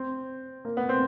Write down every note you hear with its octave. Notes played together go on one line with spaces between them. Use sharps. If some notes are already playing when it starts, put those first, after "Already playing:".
Already playing: C4
A#3
B3
C4